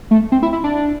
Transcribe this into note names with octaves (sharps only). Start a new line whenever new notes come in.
A3
C4
E4
E4
D4